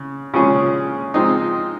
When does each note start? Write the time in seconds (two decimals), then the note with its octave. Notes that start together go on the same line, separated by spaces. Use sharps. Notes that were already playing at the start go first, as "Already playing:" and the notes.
Already playing: C#3
0.34 C#3 F3 G#3 C#4 G#4
1.14 F3 G#3 C4 D#4